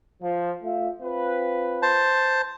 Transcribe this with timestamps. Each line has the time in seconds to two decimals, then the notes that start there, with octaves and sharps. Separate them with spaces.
0.23 F3
0.63 A3 F4 E5
1.02 C4 F4 B4
1.82 C5 A5